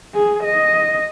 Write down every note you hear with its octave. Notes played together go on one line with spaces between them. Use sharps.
G#4
D#5